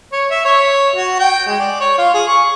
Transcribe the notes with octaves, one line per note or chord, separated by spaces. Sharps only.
C#5
E5
C#5
F#4
G5
G#3
D5
C#5
F4
G#4
C#6